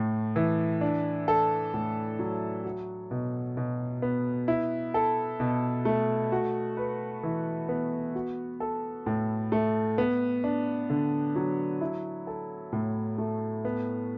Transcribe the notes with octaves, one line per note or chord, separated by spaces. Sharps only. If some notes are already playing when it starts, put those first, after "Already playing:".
Already playing: A2 A3
E3
D4
A4
A2
F#3
F#4
B2
B2
B3
E4
A4
B2
A3
F#4
B4
E3
B3
F#4
A4
A2
A3
B3
D4
D3
F#3
E4
A4
A2
A3
B3